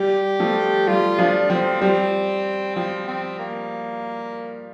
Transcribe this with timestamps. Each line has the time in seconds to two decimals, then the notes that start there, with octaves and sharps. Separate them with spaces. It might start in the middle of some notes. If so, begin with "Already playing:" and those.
Already playing: G3 G4
0.40 F3 A3
0.87 G3 F4
1.19 F3 D4
1.50 F3 C4
1.82 G3 C4
2.76 F3 C4
3.08 C4
3.39 A#3